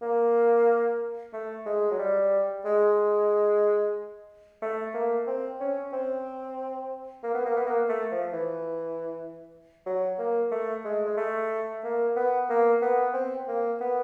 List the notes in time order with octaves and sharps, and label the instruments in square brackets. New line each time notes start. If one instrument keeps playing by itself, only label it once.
[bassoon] A#3
A3
G#3
F#3
G3
G#3
A3
A#3
C4
C#4
C4
A#3
B3
A#3
B3
A#3
A3
F3
E3
F#3
A#3
A3
G#3
G#3
A3
A#3
B3
A#3
B3
C4
A#3
B3